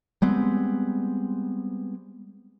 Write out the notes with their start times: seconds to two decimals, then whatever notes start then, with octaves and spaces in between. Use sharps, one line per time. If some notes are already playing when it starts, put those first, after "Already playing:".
0.22 G3 G#3 B3 C4